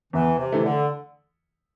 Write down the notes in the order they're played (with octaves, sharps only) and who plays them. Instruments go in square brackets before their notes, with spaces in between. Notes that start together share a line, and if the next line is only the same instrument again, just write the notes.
[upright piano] E2 [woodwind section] E3
[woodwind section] C3
[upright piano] E3 A3
[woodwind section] D3